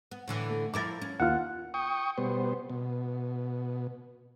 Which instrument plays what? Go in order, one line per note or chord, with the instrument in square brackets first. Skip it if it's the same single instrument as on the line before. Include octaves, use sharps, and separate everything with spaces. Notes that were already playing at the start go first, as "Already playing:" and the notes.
[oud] B3
A2 D3 E3
[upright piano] A3
[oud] F3 E4 A#4 [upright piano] D6 A6
[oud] C#4
[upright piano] D#2 F4 F6 [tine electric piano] F#5
[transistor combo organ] G5 C#6 D#6
B2 G3 B3 C5
B2